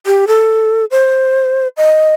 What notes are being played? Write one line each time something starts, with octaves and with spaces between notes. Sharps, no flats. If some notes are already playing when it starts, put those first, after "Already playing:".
G4
A4
C5
D#5